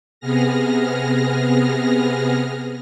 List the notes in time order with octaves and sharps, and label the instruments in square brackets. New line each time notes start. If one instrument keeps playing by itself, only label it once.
[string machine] C3 B3 G#4 F6 A#6